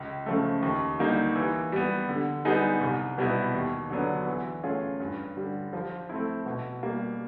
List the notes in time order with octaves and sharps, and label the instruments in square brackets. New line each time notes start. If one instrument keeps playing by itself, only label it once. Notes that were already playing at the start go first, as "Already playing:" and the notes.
Already playing: [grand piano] C#2
C#3 F3 A3
D#2
D3 G3 A#3 D#4
E3
G3 B3
D3
G3 B3 D#4 G#4
C2
B2 G3 B3 E4
D#2
D3 F#3 B3 D4
E3
A3 C#4 F4 G#4
G2
D3 G3
F3
A3 C4 E4
B2
G3 A#3